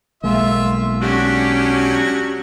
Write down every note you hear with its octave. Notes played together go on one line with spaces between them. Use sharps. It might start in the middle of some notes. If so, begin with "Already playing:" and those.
B1 G#3 A#3 F4 E5
F#3 C#4 D4 F#4 G4